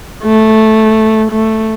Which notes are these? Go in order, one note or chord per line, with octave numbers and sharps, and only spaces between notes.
A3
A3